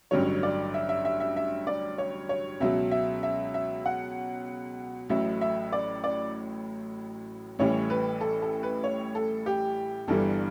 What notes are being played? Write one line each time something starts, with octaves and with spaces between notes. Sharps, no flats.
A1 G2 D3 F#3 C#5
D5
E5
E5
E5
E5
E5
D5
C#5
C#5
C#2 B2 F#3 E5
E5
E5
E5
F#5
A1 A2 F#3 E5
E5
D5
D5
A1 A2 E3 G3 C#5
B4
A4
A4
B4
C#5
A4
G4
G1 G2 E3 G3 A4